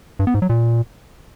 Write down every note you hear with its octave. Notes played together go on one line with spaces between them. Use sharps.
G2
B3
G#2
F#3
A#2